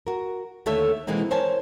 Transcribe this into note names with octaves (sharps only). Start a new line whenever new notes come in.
F#4 A#4
D#2 D3 A3 A4 C#5 E5
B2 E3 G#3 A#3 C4 D#4
A#4 C5 C#5 G#5 A5